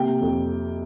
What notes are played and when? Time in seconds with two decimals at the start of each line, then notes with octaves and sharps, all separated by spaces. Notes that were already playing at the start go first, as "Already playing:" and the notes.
Already playing: C3 A#3 G5
0.21 F2